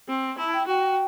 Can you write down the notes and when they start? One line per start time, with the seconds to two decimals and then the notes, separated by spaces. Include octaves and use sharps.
0.08 C4
0.38 E4 A5
0.53 G5
0.67 F#4 G5